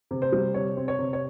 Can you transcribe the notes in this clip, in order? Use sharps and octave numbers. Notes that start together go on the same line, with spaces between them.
C3
C5
G3
C3 C#5
C4
C#5
C3
C#5